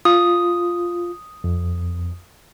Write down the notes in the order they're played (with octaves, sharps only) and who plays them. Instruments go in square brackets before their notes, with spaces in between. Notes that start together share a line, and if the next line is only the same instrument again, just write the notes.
[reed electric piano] F4 [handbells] D#6
[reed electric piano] F2